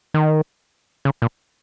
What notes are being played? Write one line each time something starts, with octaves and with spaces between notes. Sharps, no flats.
D#3
C#3
A#2